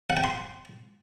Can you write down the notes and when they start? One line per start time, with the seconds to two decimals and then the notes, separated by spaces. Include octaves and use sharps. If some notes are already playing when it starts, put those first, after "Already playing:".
0.10 F#5
0.17 G5
0.24 C6